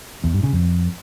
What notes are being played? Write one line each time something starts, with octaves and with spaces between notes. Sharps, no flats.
E2
G2
C#3
F2